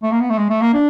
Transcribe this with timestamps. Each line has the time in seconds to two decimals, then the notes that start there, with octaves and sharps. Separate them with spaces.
0.03 A3
0.12 A#3
0.21 B3
0.30 A3
0.38 G#3
0.50 A3
0.62 A#3
0.74 D4